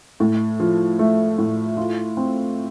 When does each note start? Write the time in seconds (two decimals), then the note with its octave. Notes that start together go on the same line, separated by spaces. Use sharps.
0.20 A2
0.60 F3
0.99 A3
1.38 A2
1.77 F4
2.17 C4